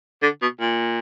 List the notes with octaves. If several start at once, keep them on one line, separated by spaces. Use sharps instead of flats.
D3
B2
A#2